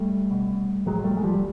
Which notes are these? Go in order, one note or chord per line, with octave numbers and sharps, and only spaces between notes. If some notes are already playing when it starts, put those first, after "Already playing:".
Already playing: G3 A3
B2
A2 F#3 G#3
G3 A3
G#3
F3 G3
F#3